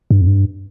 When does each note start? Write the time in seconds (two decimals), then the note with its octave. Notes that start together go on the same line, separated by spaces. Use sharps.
0.11 G2
0.21 F2
0.27 G2